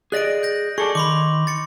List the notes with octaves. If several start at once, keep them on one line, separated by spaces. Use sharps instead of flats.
G#4 D5 D#5 F#6 A#6 D7
G6 A#6
G#4 A4 D5 C#6
D#3 B5 C6 D6
A6 C#7